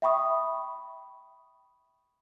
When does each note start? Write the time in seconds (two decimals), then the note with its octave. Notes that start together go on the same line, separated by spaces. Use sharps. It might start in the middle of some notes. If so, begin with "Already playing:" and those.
0.02 E5 G5 B5 C#6 D#6